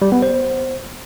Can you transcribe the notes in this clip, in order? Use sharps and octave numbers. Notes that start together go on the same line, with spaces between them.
G3
B3
C5